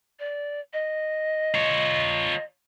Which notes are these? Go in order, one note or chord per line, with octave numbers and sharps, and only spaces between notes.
D5
D#5
F4 C#5